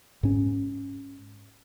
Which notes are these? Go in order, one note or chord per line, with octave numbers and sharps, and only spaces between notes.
G#2 C#4